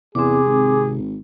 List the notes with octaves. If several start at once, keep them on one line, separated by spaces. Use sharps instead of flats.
E2 C3 C4 G#4 D6
G#1